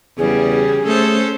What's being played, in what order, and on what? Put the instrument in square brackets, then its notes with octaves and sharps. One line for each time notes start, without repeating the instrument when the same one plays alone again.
[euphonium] E2 [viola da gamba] C#3 G3 [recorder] G#4
[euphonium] A3 [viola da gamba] C#4 A4 C5